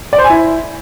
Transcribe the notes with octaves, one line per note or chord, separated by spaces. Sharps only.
D5
C5
G#5
E4